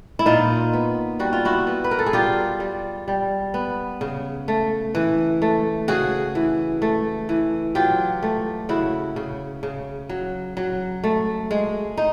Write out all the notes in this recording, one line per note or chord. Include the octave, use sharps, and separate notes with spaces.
E4
A#2 D#4 F4
B3
G3 F#4
F4
E4 F#4
B3
B4
A#4
A4
G#4
G3 F4 G4
G3
G3
B3
C#3
A3
E3
A3
C#3 F#4 G#4
E3
A3
E3
F#3 F4 G4
A3
C#3 E4 F#4
C#3
C#3
F#3
F#3
A3
G#3
D#4